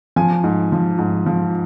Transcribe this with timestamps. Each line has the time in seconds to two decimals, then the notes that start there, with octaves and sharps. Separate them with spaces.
0.16 F3 G#5
0.44 G#2
0.72 F3
0.99 G#2
1.26 F3